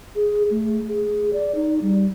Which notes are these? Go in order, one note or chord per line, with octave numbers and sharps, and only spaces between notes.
G#4
A3
G#4
D5
D#4
G3